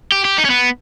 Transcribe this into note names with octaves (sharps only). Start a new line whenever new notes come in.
G4
G4
D#4
C#4
B3